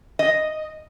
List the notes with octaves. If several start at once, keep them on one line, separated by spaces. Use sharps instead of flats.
D#5